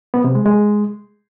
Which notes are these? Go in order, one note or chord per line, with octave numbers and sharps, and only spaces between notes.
B3
C3
G#3
G#3